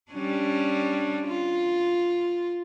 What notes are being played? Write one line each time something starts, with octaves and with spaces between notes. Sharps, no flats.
G3 C#4 D4
F4